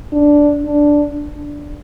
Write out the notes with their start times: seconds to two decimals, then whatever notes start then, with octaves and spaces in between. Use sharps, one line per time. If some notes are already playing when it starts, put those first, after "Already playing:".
0.12 D4
0.66 D4